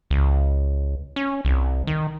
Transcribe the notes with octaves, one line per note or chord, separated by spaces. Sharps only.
C#2
C#4
C2
D#3